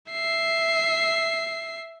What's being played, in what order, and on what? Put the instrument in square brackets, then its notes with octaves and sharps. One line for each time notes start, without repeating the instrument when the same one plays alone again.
[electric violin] E5 C7